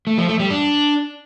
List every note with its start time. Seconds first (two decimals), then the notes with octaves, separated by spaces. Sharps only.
0.07 A3
0.18 F3
0.29 A3
0.40 G3
0.50 D4